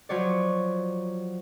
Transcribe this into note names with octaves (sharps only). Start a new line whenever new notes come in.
F3 F#3 C#5 D5